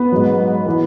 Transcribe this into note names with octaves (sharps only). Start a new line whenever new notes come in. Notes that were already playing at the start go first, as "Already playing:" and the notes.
Already playing: B3 B4
G#2 F#3
E3